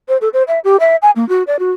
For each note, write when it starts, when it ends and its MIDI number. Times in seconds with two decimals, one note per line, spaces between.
0.08 0.17 72
0.21 0.29 69
0.33 0.43 72
0.48 0.59 76
0.64 0.77 67
0.80 0.96 76
1.02 1.11 80
1.16 1.27 58
1.29 1.43 66
1.47 1.56 74
1.59 1.71 66